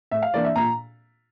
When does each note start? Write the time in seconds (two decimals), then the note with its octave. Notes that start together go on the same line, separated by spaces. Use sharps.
0.11 A2 E5
0.22 F5
0.34 E3 A#3 D4 D5
0.45 E5
0.56 A#2 A#5